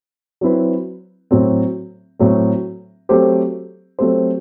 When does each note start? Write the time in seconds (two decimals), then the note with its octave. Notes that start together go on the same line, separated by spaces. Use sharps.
0.41 F#3 C4 E4 B4
1.31 A2 F#3 C4
2.19 A2 F#3 C4
3.09 F#3 A3 C4 G4 C5
3.99 F#3 A3 C4 G4 C5